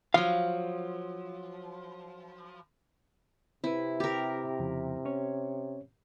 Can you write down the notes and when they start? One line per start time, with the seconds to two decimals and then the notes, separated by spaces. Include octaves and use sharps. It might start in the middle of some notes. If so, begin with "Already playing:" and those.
0.14 F3 F#3 F5
3.64 C3 C4 E4 B4
4.00 G4 A#4
4.59 F2 C#3 F3
5.05 C#4 C#5